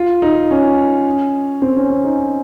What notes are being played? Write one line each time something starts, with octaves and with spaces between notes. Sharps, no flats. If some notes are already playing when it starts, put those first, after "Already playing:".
Already playing: F4
D#4
C#4
C4
C#4
C#4
D#4